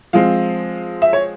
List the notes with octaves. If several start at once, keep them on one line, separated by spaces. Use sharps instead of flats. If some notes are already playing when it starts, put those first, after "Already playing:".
F3 G#3 C4 F5
E5
C#5